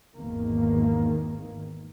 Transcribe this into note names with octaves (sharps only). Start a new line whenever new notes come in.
G#1 E2 D#3 A#3